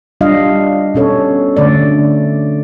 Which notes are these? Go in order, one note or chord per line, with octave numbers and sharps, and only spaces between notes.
G3 D4 F4 D#5 F5
B2 C#4 A4 C#5
D3 A3 D5